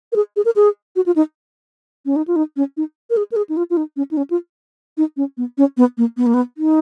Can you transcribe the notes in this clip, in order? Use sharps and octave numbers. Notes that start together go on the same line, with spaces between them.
A#4
G#4
G#4
A#4
G#4
F#4
F4
D#4
C#4
D#4
F4
D#4
C#4
D#4
A#4
G#4
A#4
G#4
D#4
F4
F4
D#4
C#4
D#4
C#4
F4
D#4
C#4
B3
C#4
B3
A#3
B3
A#3
B3
D#4